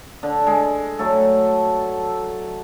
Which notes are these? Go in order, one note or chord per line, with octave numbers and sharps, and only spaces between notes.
D3
G#3
F#3 A3 A4